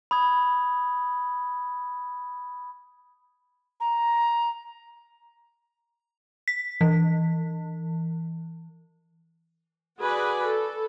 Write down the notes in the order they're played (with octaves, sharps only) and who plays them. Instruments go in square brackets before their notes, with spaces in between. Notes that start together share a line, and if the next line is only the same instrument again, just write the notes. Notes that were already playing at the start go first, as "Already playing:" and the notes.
[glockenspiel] B5 D#6 G#6
[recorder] A#5
[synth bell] B6
E3
[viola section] F#4 G#4 B4 D5 G#5
A4